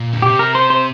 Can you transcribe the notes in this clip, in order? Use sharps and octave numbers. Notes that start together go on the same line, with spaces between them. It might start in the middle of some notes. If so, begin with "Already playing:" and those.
Already playing: A#2
D3
C3 G4
A#4
C5
C5